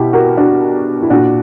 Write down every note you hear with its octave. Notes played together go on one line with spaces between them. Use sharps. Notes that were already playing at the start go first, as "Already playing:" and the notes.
Already playing: B2 E4 G4
F#4 A#4
D4 F#4
E4
A#2 D4 F#4